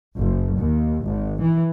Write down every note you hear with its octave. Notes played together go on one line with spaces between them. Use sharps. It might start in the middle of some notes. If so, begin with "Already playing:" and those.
F#1
D#2
G#1
E3